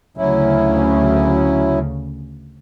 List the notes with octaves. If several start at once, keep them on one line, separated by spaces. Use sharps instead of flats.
D2 C#3 F#3 C#4 E4